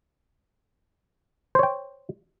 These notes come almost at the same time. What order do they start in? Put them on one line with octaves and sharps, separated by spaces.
C5 C#5 G5